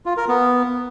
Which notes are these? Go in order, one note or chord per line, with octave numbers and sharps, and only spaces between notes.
F4
A#4
B3